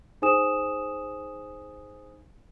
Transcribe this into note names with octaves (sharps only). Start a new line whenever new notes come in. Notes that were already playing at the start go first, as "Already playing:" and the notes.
D#4 G#4 C5 G#5 D#6 E7